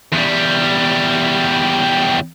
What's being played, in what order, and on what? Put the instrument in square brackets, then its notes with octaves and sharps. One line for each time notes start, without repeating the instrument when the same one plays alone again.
[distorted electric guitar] E2 G3